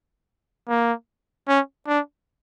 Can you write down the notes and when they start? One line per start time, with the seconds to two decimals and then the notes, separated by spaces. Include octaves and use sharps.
0.69 A#3
1.48 C#4
1.87 D4